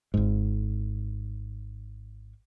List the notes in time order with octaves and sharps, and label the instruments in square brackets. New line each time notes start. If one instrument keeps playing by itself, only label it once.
[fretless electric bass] G#1 G#2